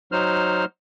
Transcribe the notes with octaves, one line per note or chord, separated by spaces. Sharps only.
F#3 D#4 C5 F6